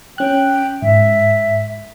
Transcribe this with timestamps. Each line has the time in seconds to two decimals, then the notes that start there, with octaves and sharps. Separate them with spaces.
0.18 C#4 G5 F#6
0.82 G#2 E5